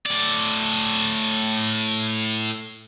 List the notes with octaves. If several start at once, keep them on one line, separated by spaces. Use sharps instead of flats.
A2 D5